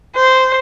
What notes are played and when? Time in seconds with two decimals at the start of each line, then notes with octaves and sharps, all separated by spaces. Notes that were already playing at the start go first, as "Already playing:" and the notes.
0.15 C5